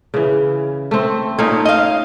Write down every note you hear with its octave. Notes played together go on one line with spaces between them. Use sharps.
C#3 E3
A3 C4
A#2 A3 C#4 D#4
D#5 F5